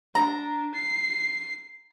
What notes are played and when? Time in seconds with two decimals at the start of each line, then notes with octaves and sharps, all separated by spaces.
0.15 D4 A#5
0.74 C7